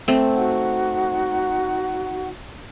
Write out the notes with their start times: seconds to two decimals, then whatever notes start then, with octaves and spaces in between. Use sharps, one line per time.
0.08 A3 C4
0.34 D#4 F#4 F#5